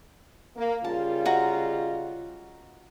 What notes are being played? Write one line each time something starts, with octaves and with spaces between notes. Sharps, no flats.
A#3
C#3 G3 F4 A5
F#4 D#5 A#5